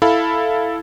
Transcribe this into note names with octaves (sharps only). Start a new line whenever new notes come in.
E4 A4 F5 B5